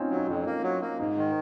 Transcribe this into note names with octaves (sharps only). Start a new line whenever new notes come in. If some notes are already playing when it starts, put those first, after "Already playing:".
Already playing: C4 C#4 D#4 F4
F#3
D#4
F2 F4
A#3
F#3
A#3
G#2 D#4
D#3